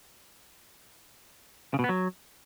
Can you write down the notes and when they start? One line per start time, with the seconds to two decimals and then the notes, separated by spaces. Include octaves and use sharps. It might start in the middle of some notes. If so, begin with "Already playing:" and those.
1.74 C#3
1.79 B2
1.84 B3
1.89 F#3